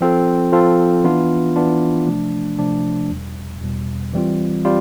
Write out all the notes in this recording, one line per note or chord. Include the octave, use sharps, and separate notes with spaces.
F3 C4 F4 A4
F3 C4 F4 A4
E3 B3 D4 F4
E3 B3 D4 F4
C3 F3 A3 D4
C3 F3 A3 D4
E2 B2 G3
E2 B2 G3
E3 G3 C4 F4
G3 C4 F4